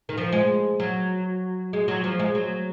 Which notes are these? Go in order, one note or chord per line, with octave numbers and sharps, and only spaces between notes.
D#3
F3
G#3
F#3
G#3
F#3
F3
G#3
F#3